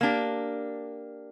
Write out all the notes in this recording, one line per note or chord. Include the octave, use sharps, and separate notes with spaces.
A#3 D4 G4